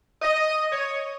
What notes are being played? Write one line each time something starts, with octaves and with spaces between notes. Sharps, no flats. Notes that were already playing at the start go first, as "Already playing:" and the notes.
D#5
C#5